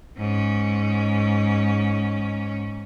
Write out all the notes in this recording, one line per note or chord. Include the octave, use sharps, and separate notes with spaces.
G#2 C#4